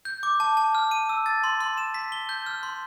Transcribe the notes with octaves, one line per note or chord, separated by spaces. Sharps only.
G6
D6
A5
A5
F6
D#7
E6
A6
C6
C6
E7
B6
G7
G6
F6
C6